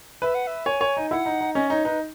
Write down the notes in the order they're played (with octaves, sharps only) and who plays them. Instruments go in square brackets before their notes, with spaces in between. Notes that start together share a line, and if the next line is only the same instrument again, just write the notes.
[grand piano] B4 [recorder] E5
[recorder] F#5
E5
[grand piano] C#5 [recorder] G#5
[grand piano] C#5
D#4
[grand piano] E4 [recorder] F#5
[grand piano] D#4
D#4
[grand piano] C#4 [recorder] D#5
[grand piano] D#4 [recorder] C#5
[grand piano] D#4 [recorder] B4